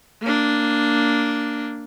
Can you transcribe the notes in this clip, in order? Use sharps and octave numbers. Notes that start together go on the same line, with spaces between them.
A#3 D4